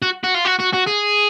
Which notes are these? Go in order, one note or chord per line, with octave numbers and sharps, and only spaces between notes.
F#4
F#4
F4
F#4
F#4
F#4
G#4